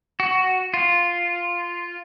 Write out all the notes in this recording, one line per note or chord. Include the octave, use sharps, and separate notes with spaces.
F#4
F4